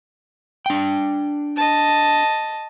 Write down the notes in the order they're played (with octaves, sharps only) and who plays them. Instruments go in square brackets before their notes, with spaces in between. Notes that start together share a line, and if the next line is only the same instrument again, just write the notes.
[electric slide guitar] D4 G5
[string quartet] D#5 A5